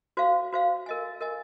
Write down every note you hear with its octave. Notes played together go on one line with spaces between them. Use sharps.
F#4 C5 F5
F#4 C5 F5
A#4 D#5 G#5
A#4 D#5 G#5